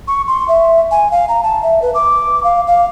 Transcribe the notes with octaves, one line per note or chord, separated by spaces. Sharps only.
C#6
C6
E5
G#5
F5
A#5
A5
E5
B4
D6
F5
F5